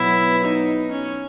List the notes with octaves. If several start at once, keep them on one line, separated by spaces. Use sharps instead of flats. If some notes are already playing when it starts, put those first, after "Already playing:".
Already playing: B2 F#3 B3 E4
D#4
C#4